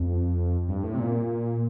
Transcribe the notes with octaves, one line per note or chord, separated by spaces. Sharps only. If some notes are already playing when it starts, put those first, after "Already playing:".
Already playing: F2
G2
A2
C3
A#2